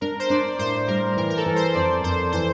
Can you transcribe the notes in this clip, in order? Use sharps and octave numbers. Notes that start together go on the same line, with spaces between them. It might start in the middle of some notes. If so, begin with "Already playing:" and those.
D4 A#4
C5
D4 D5
A2 C5
G3 A#4
E3 A#4
A#4
A4
E3
C5
F2 D5
F2 C5
E3 C5